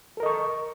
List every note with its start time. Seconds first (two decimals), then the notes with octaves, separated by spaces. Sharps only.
0.17 A4
0.20 A#4
0.23 D#5
0.26 C#6